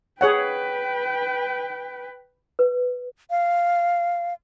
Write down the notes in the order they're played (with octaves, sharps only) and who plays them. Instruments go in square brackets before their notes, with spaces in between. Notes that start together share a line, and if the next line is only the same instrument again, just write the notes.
[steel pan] G#4 C#5 F#5 [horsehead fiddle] B4 G5
[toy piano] B4
[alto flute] F5